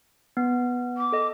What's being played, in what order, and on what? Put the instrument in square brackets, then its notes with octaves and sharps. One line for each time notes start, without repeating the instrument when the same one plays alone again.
[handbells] B3
[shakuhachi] D6
[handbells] A4 D#5